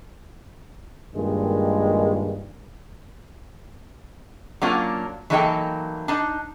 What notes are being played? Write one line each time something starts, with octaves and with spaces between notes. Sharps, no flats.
G2 A#2 D#3 G#3
F#3 A#3 C#4 D4 F4
E3 F#3 A#3 D#4 A4 G5
D4 D#4